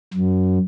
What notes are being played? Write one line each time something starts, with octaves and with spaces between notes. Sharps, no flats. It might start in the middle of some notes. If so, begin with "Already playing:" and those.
F#2